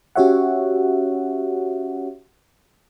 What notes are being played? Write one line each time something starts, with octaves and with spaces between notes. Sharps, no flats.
C#4 F#4 G4 C#5 E5 F#5